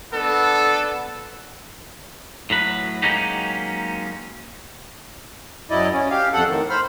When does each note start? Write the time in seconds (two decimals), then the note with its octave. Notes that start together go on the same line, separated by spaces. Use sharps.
0.12 B3 D4 A4
2.50 A2 F#3 B4
3.02 F#3 G#3 A#3 C#4 D#4 G4
5.70 F#2 F#3 E4 D5 D#5
5.93 C#4
6.11 G4 F5
6.33 F2 A4 F#5
6.47 A2 D#3
6.70 C5 B5 F6